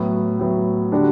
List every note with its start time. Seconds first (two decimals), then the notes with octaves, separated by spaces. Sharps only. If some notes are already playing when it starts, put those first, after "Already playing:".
Already playing: A2 F#3 B3
0.39 A2 F#3 B3
0.92 D3 G3 D4 F#4